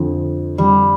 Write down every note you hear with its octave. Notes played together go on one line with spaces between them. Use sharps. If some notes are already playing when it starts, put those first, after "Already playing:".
Already playing: F2 D3 F3
F2 D3 F3 G3